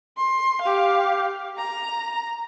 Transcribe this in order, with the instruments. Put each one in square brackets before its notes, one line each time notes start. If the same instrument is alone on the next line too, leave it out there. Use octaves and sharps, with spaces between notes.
[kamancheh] C6
G4 F5
A#5